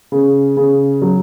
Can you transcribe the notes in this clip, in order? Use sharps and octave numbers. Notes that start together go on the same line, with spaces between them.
C#3
C#3
F#3